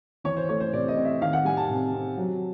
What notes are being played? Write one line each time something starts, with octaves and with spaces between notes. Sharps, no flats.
E3 C#5
C5
A3 C#5
C5
C3 D5
D#5
C4
E5
D#3 F5
F#5
G3 G#5
A5
C3
C4
F#3